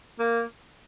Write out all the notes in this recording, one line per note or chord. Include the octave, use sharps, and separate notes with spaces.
A#3